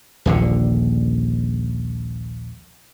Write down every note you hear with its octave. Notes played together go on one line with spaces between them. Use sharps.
D#1 A#1 D3